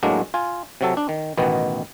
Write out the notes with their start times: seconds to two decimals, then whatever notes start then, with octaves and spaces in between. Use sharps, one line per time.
0.03 A2 F#3 G#3 A#3 D4
0.34 F4 G#5
0.81 C3 F#3 A4
0.97 D4
1.09 D#3
1.37 A1 B2 D#3 B3